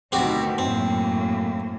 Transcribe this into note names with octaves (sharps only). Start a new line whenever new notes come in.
D2 B2 D#3 C4 F#4 G4
F#2 A2 A#3 C4